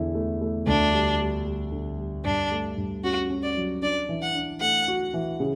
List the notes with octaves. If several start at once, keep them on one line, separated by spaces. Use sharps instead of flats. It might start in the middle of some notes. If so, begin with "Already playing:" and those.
Already playing: E2 D3 E4
A3
A3
D2 D4
G3
G3
G3
D3
G3
G2 D4
A3
G2
C#4 F#4
C#4
D5
F#3
D4 D5
E3
F#5
D4
A3 F#5
F#4
E3
C#3